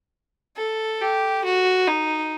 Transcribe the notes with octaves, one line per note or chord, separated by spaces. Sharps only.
A4
G4
F#4
D#4